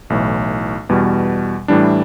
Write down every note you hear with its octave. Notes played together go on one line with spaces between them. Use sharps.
B1 A2 E3
E2 B2 G3
A2 E3 G3 D4